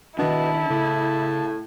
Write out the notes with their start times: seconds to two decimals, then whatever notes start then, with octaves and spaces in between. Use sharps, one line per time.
0.19 B2 D#3 D4 E4 A5
0.70 A2 C#3